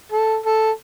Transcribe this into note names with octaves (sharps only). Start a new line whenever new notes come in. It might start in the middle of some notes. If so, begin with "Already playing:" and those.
A4
A4